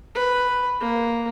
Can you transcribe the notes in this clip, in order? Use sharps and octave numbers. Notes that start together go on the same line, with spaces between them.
B4
A#3